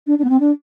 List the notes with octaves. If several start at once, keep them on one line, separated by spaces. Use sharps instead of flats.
D4
D4
B3
C4
D4